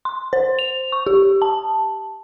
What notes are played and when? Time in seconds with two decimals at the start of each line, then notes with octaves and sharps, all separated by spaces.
0.05 C6
0.33 C5
0.59 F7
0.92 C#6
1.07 G4
1.42 A5